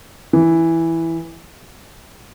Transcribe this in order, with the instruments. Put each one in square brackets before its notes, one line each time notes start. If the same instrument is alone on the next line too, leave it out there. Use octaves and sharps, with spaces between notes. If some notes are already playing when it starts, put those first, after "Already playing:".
[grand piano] E3